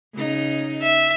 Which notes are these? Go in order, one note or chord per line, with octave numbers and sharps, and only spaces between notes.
C#3 D#4
E5